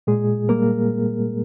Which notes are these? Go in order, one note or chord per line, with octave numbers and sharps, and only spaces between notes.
A#2 G#3 G#4
G3 A#3 A#4